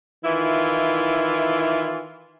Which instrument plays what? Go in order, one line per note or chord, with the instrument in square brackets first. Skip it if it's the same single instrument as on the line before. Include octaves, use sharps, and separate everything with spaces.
[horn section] D#3 E3 E4 F4